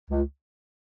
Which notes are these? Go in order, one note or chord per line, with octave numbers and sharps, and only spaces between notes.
C#2